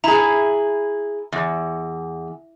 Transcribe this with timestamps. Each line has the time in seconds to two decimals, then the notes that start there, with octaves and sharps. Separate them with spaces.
0.04 E4 G#4 A#5
1.32 E2